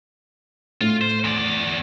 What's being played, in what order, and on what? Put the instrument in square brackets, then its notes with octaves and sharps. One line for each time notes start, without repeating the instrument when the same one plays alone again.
[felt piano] A2 [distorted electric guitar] F4
[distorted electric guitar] C5
E2 D5